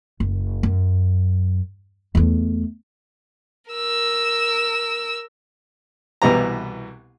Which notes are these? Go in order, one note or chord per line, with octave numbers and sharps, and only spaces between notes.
F#1
F#2
E2 A3
A#4 E6
C2 B2 E3 B3 G4 A#5